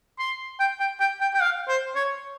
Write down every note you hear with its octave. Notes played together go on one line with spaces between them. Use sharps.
C6
G5
G5
G5
G5
G5
F5
C5
C#5